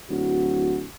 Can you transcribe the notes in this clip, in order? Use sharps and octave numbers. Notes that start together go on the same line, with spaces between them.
D1 F#4